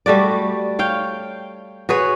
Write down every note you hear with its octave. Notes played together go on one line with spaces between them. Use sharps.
G3 A3 F#4 D5
C#5 F5 G5
F#4 G#4 B4 C#5